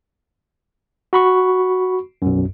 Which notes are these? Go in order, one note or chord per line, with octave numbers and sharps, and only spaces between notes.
F#4 B5 C#6
B1 F#2